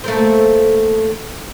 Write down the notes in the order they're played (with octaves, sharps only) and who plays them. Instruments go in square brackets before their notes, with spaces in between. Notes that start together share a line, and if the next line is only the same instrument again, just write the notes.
[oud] A3 A#3 C4